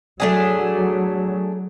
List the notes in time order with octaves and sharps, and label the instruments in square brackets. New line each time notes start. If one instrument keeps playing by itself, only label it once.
[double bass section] F#3 [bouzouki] A3 D4 G#4